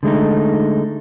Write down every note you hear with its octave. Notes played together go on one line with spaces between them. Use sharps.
D3 G#3 A3 D#4